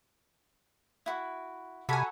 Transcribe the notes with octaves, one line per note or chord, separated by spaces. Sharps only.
E4 F#4
C3 F#4 A4 G#5 A#5 B5